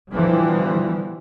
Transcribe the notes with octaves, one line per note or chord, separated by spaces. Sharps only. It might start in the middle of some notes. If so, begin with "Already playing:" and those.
B2 D3 E3 F3 G3